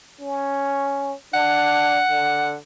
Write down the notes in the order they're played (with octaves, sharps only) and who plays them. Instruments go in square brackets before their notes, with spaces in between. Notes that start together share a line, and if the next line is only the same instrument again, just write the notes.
[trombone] C#4
[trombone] D4 [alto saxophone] F#5
[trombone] D3